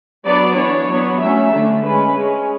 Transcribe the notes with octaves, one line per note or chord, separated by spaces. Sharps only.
F#3 B3 D4 D5
E3 B3 D4 C#5
F#3 B3 D4
F#3 A3 C#4 E5
D3 A3 D4
G#3 C#4 B4
G#3 C#4